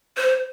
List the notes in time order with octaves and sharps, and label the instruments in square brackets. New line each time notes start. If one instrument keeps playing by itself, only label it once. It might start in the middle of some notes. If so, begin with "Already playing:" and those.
[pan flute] C5